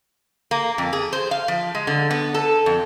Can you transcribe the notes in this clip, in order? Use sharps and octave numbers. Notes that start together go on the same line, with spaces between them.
A#3
F2
G#4
C5
F5
F3
G#3
D3
B3
A4
F2